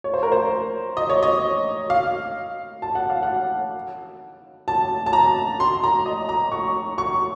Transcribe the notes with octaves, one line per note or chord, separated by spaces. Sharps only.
C#5
C5
A#4
C5
D#5
C#5
D#5
F5
A5
F#5
F5
F#5
A5
A5
A#5
C6
A#5
D#5
A#5
C#6
C#6